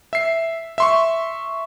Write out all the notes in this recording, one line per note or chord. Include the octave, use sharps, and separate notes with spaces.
E5 C7
E5 C6 C#6